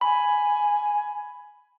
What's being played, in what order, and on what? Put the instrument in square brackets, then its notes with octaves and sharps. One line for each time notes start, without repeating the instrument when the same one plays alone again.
[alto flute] G#5 [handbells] B5